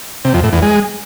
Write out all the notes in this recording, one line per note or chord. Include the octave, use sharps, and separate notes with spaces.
C3
F2
A2
E2
G#3